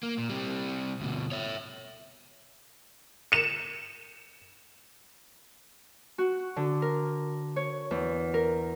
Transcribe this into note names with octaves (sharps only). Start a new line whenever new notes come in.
A#3
A#2
C3 G3
D2 B2
C#5 E5
C#7 E7
F#4
D3
A#4
C#5
E2
A#4